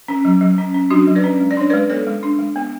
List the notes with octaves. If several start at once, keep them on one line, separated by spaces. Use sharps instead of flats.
C#4
F#3
F#3
C#4
C#4
F#3 D4 F#4
F#3
B4 D5
C#4
G#3
D5
D4 C#5
B4 D5
G#3
B3 A4 C#5
G#3
D4
G#3
B3